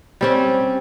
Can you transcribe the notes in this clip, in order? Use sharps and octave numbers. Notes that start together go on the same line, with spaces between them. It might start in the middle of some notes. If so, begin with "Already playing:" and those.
G3 C4 C#4